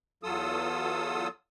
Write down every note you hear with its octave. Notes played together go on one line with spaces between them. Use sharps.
E2 F#3 F4 A4 D#6 E6